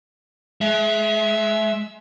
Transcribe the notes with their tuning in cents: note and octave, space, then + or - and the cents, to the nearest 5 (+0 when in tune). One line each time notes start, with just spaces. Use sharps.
G#3 +35 E5 +0